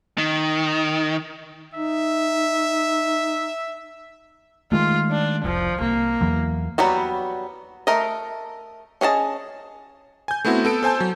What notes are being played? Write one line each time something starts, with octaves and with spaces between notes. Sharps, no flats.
D#3
D#4 E5
D#3 G#3 A3 F4
D4
F1 C2 F3
C2 A#3
E2 E3 F#3
F#3 G3 B3 F#4
A3 A#4 D#5
C#4 G#4 D#5 A5
G#5 G6
A3 B3 C4 E4 F#4
B3 A4 D7
A4 C5 G#5 A5 G6
F#3